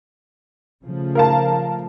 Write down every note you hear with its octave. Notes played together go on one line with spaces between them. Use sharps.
C#3 F3 A3
A#4 F5 A5